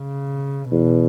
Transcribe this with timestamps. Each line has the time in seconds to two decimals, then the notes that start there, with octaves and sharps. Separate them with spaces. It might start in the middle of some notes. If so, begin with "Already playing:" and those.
Already playing: C#3
0.71 E2 B2